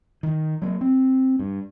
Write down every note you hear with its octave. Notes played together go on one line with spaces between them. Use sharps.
D#3
F#3 A3 A#3
C4
G2